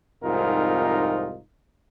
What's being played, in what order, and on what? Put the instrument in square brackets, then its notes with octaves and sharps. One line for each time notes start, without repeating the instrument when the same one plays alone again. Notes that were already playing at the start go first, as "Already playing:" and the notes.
[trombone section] C2 F2 G#2 D#4 F4 A#4